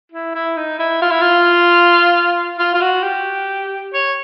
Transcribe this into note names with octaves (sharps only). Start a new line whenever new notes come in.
E4
E4
D#4
E4
F4
E4
F4
F4
F4
F#4
G4
C#5